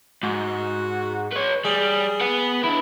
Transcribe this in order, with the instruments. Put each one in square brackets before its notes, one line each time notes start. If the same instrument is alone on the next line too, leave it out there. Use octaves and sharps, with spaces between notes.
[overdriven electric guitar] G#2 [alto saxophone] F#4
[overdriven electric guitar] B4 C#5
[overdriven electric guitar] G3 [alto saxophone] G#4
[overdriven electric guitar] B4 F#5
D4 E4